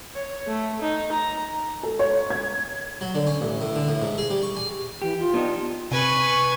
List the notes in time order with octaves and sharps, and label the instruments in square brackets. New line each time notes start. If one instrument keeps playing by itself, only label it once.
[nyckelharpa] C#5
A3
D#4
A#5
[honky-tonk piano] A4
C#5
G#6
[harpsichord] F#3
D3
C#4
A1
A2
D3
A2
G#2
G#4
G3
C#6
G#5
[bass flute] E3 [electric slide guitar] G4
[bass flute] F4
[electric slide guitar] B3 D4 D#4
[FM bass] C3 [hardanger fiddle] B4 G#5 [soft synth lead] C#6